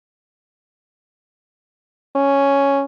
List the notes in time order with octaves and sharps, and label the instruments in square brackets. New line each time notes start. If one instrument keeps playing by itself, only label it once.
[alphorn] C#4